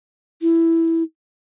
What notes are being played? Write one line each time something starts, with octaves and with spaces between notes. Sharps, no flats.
E4